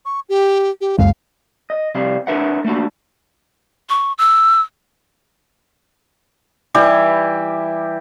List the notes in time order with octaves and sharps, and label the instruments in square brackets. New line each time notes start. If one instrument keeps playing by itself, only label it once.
[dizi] C#6
G4
G4
[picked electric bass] C#2 F#2 G#3 [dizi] F5
[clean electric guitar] D#5
C3 G3 F5
D4 A#4 B4 E5 F#5
A3 A#3 D4 F#4
[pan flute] C#6
E6
[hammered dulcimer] E3 G3 E4 G4